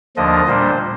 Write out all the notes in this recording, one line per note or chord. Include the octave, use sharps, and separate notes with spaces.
D#2 D3 F3 A#3 D4 D#5
A#2 G3 A#3 D4 C5